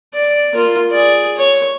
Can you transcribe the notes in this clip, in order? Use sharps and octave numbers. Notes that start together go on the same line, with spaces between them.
D5
A#3 F4
G#4 D5
C#5